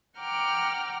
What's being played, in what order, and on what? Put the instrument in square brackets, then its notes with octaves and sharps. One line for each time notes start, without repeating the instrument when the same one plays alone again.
[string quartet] F#5 G5 A#5 D6 F6